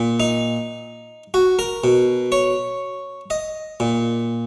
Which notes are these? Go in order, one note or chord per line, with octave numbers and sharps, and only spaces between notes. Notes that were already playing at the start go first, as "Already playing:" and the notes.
Already playing: A#2
D#4
F#4
A#4
B2
C#5
D#5
A#2